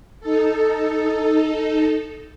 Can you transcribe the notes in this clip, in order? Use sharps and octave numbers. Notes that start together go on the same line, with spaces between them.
D#4 A4